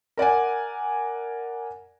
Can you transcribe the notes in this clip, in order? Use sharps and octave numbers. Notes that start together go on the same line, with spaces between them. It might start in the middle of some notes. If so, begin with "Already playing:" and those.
A#4 D5 F#5 G#5